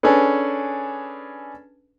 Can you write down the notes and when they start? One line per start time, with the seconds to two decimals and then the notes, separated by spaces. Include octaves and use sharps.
0.03 C#4 D4 G#4 A4 B4